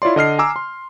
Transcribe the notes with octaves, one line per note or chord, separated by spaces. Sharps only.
E4 F4 C#5 D5 C6
D3 D#5 F6 C7
G#5 A#5 D6 E6
C6